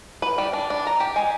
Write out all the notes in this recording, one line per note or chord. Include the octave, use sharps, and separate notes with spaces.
B4
G3
D4
D4
A#5
G4
G#3